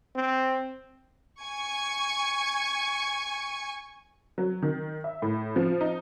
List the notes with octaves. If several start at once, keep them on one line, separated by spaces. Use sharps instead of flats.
C4
G#5 C#6 G#6
F#3
D#3
E5
A2
F3
D#4